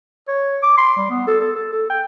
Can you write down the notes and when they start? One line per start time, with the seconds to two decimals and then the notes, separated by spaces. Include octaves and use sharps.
0.28 C#5
0.62 D6
0.77 C6
0.97 G3
1.09 B3
1.27 A4
1.41 A4
1.55 A4
1.72 A4
1.90 G5